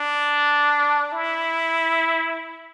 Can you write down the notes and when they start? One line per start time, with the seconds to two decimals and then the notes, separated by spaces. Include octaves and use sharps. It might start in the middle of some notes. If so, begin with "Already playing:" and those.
Already playing: D4
1.12 E4